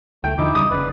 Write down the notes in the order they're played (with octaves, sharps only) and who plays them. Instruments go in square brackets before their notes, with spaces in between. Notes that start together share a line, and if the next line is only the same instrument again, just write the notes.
[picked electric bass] C#2 [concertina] A3 [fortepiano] G5
[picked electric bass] D#2 D3 F3 [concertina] D#4 E4 D6
[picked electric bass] D#2 C#3 G3 [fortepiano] D#6
[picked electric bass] F1 C#3 [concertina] B4 D5